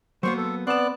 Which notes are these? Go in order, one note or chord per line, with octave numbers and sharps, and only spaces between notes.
F#3 A#3 B3 C5 C#6
A4
B3 C4 D5 A5 F#6